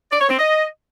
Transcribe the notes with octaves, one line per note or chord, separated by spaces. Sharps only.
D5
C#5
C4
D#5